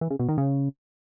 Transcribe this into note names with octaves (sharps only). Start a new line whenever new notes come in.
E3
C#3
B2
D#3
C#3